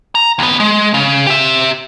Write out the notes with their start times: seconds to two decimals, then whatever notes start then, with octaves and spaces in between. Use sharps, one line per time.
0.15 A#5
0.39 D#2 B3
0.60 G#3
0.94 C#3
1.26 G4 E5